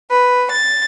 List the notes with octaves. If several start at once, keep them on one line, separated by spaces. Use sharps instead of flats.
B4
A6